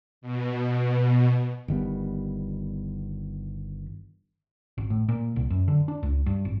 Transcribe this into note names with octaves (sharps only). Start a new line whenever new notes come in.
B2
G1 D#3 G3 B3
G#1
A2
A#2
C2
F#2
D3
D4
C#2
G2
G#1